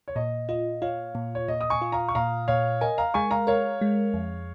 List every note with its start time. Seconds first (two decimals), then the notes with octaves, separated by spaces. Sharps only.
0.08 C#5
0.16 A#2 D#5
0.49 F4 D#5
0.82 F4 C#5 F5
1.15 A#2
1.35 C#5
1.48 A#2 D#5
1.61 D#6
1.70 G#5 C#6
1.82 F4
1.92 F5 A#5
2.08 C#6
2.15 A#2 F5 A#5
2.48 A#2 C#5 F5
2.81 A#4 D#5 G#5
2.98 F5 A#5
3.14 G#3 G#5 C#6
3.31 F5 A#5
3.47 A#4 C#5 F5
3.81 G#3
4.14 F2